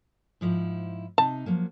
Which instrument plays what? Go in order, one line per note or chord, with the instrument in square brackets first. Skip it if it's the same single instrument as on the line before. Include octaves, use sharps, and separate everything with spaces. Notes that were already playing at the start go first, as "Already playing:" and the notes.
[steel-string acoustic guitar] G#2 F3 E4
[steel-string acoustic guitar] C3 D#4 [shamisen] A5
[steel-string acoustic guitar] F3 F#3 A#3